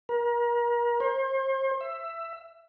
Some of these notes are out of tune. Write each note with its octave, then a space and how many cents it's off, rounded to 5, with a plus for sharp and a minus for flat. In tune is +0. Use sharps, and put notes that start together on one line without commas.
A#4 +35
C5 +35
E5 +15